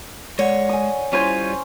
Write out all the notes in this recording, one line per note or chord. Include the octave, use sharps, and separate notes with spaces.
G#3 C#5 D5 F#5
G#5 D#6
G3 C#4 E4 F4 C5 C6 G#6 D#7